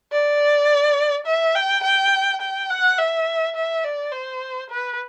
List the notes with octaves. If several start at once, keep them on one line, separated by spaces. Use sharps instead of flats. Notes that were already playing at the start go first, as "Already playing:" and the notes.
D5
E5
G5
G5
G5
F#5
E5
E5
D5
C5
B4